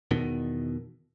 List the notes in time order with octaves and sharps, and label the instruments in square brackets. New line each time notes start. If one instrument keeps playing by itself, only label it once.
[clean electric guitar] E2 B2 D#3